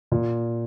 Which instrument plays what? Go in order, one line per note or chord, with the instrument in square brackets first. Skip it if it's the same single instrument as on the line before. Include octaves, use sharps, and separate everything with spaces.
[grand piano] A#2